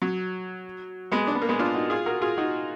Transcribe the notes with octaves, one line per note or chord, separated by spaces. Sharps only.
F#3
G#3 B3
D4
B3
A#3
G#3 B3
D4 F4
D#4 F#4
F4 G#4
F#4 A#4
F4 G#4
D#4 F#4